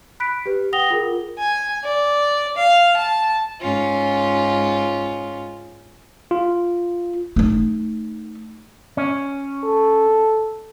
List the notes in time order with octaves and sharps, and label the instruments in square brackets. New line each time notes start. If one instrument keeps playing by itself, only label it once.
[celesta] B5 F#6 B6 D7
G4 B4
F#5 G5 D#6 A#6 F7 G7
F4 G#4 A#4
[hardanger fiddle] G#5
D5
F5
A5
[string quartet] G#2 C#4 F4
[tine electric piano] F4
[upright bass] A3 D#4
[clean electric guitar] C#4
[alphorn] A4